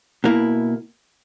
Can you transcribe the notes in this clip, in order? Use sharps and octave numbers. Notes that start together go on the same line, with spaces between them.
B2 A#3 E4